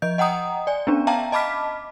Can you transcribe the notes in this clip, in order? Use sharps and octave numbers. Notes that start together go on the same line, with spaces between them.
F3 D#5 G6
D#5 F#5 G5 A#5 D#6
D5 G#5
B3 C#4 D4
E5 F5 G5 A5 A#5
D#5 A5 B5 D6 F6 B6